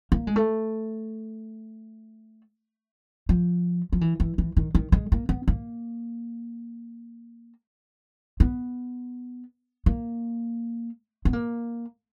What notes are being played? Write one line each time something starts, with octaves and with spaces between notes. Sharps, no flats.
A#3
G#3
A3
F3
F3
E3
E3
E3
D#3
D#3
G#3
A#3
B3
A#3
B3
A#3
B3
A#3